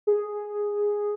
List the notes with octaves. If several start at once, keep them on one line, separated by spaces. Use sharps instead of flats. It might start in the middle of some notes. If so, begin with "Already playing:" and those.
G#4